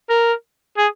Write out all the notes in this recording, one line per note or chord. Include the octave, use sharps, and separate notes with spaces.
A#4
G#4